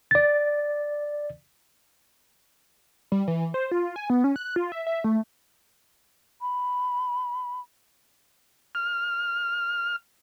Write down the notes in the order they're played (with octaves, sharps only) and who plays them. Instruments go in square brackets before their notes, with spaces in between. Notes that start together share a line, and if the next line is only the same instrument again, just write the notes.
[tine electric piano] D5 A6
[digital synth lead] G3
E3
C5
F4
G#5
B3
C#4
F#6
F4
E5
E5
A3
[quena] B5
[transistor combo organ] F6